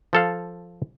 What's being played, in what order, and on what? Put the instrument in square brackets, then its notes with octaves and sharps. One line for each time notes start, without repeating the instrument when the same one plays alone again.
[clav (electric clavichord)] F3 A4 F5